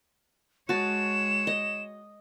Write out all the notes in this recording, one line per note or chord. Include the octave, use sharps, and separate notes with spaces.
G#3 F#4 C#5 A5 E7
D#5